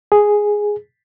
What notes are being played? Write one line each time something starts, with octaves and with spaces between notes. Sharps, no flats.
G#4